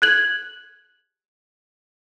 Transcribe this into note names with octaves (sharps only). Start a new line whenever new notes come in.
F#6 G#6 F#7